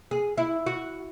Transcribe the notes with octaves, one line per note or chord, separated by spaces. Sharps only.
G#4
E4
F#4